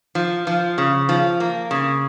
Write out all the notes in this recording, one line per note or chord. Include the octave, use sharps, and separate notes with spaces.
F3
F3
C#3
F3
A#3
C#3